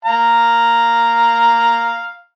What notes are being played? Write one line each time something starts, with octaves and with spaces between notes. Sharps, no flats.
F5 A#5